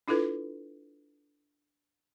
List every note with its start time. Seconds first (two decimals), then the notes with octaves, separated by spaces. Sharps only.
0.08 D4 E4 F4 A4 B4